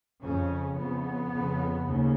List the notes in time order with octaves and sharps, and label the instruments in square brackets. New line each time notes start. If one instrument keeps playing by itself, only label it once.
[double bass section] F2 C#3 C#4
F2 C#3 B3
F2 C#3
D#2 C#3